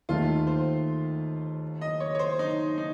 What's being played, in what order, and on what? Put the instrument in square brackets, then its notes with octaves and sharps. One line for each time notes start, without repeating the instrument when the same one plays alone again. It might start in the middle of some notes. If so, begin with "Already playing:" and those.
[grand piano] D#2 D#3 A3 [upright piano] F4
[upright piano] C5
D#5
C#5
C#5
C5
D#4
D#4